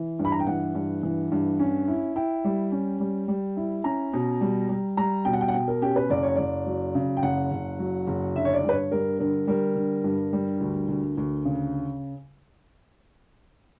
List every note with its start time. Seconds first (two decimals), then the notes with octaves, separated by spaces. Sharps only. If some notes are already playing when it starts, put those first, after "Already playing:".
Already playing: E3
0.19 G2
0.25 B5
0.32 A#5
0.40 G5
0.47 E3 F#5
0.75 G2
1.03 E3
1.32 G2
1.60 C#4
1.88 E4
2.16 E4 G5
2.44 G3
2.72 C#4
3.00 G3
3.28 G3
3.57 E4
3.84 C#4 A#5
4.14 B2
4.41 G3
4.69 G3
4.97 G3 A#5
5.25 B2 G5
5.33 F#5
5.41 G5
5.48 F#5
5.54 B2 G5
5.68 A#4
5.82 C#4 G4
5.96 B4
6.10 F#1 D5
6.23 C#5
6.36 F#1 D5
6.67 F#3
6.95 C#3
7.17 G5
7.23 F#1 F#5
7.51 F#1
7.79 F#3
8.07 F#1
8.35 D3 E5
8.45 C#5
8.54 D5
8.64 G2 B4
8.72 C#5
8.92 G3 A#4
9.19 D3 A#4
9.47 G3 A#4
9.76 D3
10.04 G2
10.33 G3
10.61 D2
10.89 D2
11.17 D2
11.45 C#3